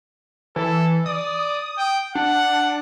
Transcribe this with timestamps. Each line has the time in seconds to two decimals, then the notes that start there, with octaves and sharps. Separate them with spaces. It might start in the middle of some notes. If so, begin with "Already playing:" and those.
0.56 E3 A4
1.06 D5 D#6
1.78 G5
2.15 D4 F#5